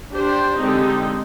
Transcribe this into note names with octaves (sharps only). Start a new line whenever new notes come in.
D4 G4 C5
D3 G#3 C4 D#4 G4